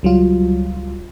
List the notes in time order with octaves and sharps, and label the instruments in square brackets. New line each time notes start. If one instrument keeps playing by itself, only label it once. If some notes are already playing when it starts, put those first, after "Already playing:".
[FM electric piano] C#2 F#3 G3 F4